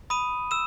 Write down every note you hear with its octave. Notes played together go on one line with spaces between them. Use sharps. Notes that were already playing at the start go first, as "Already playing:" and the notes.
B5 D#6 D#7
E6 E7